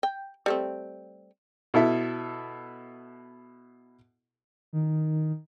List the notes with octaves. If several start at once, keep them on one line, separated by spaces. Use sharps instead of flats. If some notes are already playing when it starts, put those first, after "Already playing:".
G5
G3 A3 C4
B2 E4 A4 E5
D#3